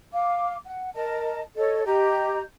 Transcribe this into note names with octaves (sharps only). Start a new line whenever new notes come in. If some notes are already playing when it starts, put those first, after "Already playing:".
F5 D6
F#5
A#4 D#5 A5
A4 C#5 D#5
G4 D#5 A#5 G6